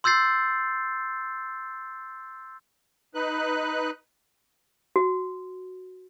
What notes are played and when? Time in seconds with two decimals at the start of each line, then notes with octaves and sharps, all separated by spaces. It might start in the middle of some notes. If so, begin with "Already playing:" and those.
0.04 C6 E6 G6 A6 C7
3.15 D#4 B4 F#6
4.96 F#4